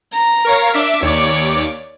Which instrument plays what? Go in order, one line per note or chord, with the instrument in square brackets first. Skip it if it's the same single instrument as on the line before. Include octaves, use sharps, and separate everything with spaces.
[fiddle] A#5
[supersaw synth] A#4 C#5 F5
[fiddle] D4 [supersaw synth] E5 D6
[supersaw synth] D#2 D6 [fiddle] C#5 D5